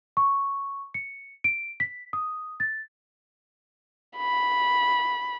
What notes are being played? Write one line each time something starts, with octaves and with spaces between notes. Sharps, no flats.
C#6
C#7
D7
B6
D#6
A6
B5